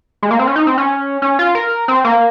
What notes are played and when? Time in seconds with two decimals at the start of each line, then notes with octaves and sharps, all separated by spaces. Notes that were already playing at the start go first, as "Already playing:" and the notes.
0.23 G#3
0.31 A#3
0.39 C4
0.47 C#4
0.56 D#4
0.67 C4
0.78 C#4
1.22 C#4
1.39 F4
1.55 A#4
1.88 C4
2.04 A#3